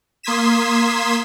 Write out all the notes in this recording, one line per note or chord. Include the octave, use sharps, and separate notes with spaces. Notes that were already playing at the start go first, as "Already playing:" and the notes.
A#3 C6 D#6 G#6 B6 E7